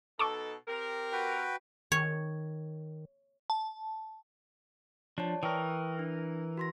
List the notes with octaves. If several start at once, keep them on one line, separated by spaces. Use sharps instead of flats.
B2 D#4 A4 A5 C#6 D6
C4 G4 A#4
F#4 B4 G5
D#3 C#5
A5
F3 D4 C#5 D5 A5
E3 A#4 G5 C#6 D#6
D4
F#4 C6 A#6